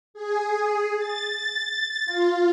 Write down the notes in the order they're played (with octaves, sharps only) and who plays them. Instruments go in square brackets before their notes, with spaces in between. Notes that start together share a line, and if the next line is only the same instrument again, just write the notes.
[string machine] G#4
A6
F4